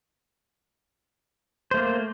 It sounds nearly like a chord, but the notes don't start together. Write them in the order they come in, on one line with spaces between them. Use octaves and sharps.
C5 A3 A#3